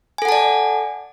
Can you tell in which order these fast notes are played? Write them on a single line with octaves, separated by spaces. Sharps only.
G#5 A4 F#5 A5 D5